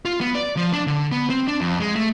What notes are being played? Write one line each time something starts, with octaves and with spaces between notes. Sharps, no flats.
F4
B3
D5
F3
D4
D3
B3
C4
D4
F2
G#3
A3